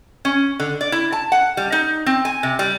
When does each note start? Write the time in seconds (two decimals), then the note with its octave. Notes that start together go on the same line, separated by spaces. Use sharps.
0.25 C#4
0.60 D3
0.81 D5
0.92 E4
1.12 A5
1.32 F#5
1.57 G3
1.72 D#4
2.06 C4
2.25 G#5
2.43 C3
2.59 G3